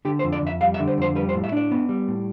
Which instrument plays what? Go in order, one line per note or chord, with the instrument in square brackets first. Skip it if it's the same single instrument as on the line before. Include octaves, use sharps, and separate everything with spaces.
[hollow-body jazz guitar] D3 G4
C5
F2
D5
F2 E5
G3 F5
E5
D3
C5
F2 C5
G3 B4
C5
A2
E5
D4 D5
B3
G3
A2